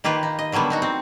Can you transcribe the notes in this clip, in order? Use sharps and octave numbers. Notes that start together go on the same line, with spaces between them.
D#3 A#3 F4 G4 B4
D#4
D#5
D3 F#3 G3 A#3 B3
B3 D#4 F#4
C4